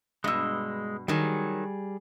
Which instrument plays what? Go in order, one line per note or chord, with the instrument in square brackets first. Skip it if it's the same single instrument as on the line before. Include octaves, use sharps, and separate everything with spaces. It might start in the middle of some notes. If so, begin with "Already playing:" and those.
[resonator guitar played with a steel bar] G2 B2 [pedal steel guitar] G#3 D#5 E6
[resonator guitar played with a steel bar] D#3 F#3 [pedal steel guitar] G3 G#4